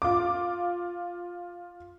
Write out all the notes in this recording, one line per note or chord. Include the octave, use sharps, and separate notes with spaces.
F4 D6